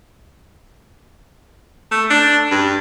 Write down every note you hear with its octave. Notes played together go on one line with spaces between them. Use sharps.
A3
D4
G2